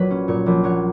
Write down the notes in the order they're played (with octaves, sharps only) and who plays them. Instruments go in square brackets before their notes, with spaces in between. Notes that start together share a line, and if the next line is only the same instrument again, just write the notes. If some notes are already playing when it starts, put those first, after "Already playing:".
Already playing: [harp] A#1 F#3 B4 C#5
C#4
A#2 C#5
A#1
F#3 C#5